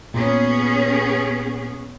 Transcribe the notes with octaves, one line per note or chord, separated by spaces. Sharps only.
A#2 B3 C#4 G#4